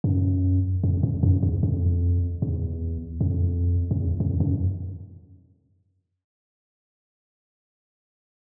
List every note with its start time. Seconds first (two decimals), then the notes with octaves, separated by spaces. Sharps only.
0.04 F#2
0.84 F2
1.03 F2
1.23 F#2
1.43 E2
1.63 F2
2.42 E2
3.21 F2
3.91 F2
4.00 E2
4.20 F2
4.40 F#2